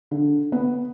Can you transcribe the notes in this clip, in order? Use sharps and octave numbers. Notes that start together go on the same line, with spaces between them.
D3
B3